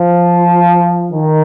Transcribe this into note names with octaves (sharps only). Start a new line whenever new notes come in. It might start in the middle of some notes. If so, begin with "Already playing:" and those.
Already playing: F3
D#3